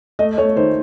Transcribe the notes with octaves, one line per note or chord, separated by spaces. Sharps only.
A3 D#5
A3 C#5
D#3 C5